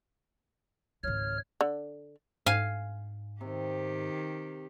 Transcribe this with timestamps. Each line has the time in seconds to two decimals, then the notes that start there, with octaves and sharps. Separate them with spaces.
1.03 G#1 C#2 C#5 F6
1.61 D3
2.46 G#2 F5 G#5
3.41 C3 D#3 G4